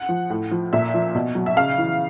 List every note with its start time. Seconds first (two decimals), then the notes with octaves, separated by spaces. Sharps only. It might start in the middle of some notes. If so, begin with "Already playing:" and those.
Already playing: F#5
0.09 F3
0.30 A2
0.51 F3
0.73 A#2 E5
0.94 F3
1.15 B2
1.35 F#3
1.46 E5
1.57 C#3 F5
1.78 E3